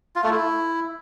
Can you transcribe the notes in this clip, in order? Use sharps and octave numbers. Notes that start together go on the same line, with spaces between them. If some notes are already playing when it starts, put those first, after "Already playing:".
F4
A3
E4